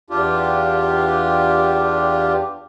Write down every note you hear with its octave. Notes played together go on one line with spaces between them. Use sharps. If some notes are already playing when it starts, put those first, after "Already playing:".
E2 D4 F4 G4